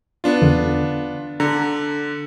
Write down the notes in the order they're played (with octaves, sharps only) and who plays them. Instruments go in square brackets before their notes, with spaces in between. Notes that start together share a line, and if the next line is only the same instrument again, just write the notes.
[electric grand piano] B3 D4 F4
[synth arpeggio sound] E2 D3
[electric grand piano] D3 [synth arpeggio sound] A#5